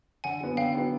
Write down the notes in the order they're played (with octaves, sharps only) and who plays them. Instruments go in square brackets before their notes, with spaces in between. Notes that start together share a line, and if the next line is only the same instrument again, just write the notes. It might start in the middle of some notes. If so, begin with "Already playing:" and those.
[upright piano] D3 [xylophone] F#5 G#5
[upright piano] F#3 B3
[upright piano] D3 [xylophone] F5 G5
[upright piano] F#3 B3